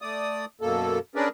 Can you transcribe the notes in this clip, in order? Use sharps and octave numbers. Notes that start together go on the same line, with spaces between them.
A3 D5 D#6
F#2 B2 A#3 A4
C#4 D4 G#4 A#4 B4 D5